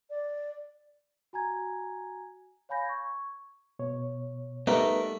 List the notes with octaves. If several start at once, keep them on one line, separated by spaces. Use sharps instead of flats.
D5
F#4 G#5 A#5 G#6
C#5 F5 G#5 B5 G6 A#6
C#6 G#6
B2 C#5
G3 A3 B3 D#4 A#4 E5